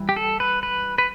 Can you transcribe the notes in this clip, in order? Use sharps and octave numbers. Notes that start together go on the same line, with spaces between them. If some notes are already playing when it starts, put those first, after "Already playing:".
Already playing: E3 G3
G4
A4
B4
B4
B4